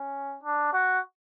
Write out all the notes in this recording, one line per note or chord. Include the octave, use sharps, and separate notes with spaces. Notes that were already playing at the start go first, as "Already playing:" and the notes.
Already playing: C#4
D4
F#4